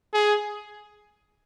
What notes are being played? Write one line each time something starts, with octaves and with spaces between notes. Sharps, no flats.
G#4